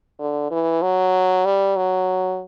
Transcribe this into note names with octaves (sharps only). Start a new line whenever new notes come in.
D3
E3
F#3
G3
F#3